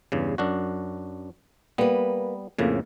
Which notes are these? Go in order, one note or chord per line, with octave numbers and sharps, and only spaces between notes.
E2 G2 C#3
F#2 D4 F#4
G3 A#3 B3 B4
F2 A2 C#3 A#3